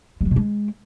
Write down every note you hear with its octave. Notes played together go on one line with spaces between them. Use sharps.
G#3
F#3
B2
G#3